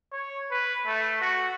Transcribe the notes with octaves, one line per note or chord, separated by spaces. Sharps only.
C#5
B4
A3
F#4